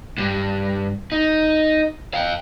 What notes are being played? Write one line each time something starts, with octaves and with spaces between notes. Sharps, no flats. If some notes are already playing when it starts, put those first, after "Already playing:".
G2
D#4
F5 G5